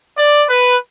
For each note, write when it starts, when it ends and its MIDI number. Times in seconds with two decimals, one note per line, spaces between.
0.16 0.43 74
0.49 0.77 71